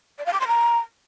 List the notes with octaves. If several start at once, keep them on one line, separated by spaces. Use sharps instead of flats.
D5
F5
D6
C6
A#5